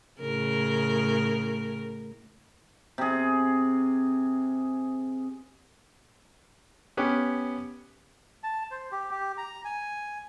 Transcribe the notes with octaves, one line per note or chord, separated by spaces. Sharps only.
A2 C#3 A#4
C3 G#4
B3 C#4 G4
A5
C5
G4
G4
A#5
G#5